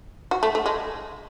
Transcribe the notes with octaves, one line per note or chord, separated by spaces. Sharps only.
F#4
A3
A3
G#3